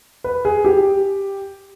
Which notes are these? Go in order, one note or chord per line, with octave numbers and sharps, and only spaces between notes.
B4
G#4
G4